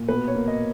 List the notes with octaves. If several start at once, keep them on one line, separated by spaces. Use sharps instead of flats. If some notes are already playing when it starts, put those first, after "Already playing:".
Already playing: A#2
B2 B4
C#5
A#3
D#5